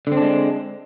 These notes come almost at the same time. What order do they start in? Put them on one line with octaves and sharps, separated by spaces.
D3 C4 D4 G#3